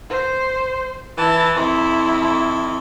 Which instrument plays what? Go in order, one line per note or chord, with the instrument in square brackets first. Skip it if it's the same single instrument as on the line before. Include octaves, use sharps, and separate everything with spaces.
[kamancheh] C5
[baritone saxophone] E3 [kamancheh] E4 A5
[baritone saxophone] F2 [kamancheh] E4
[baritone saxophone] F2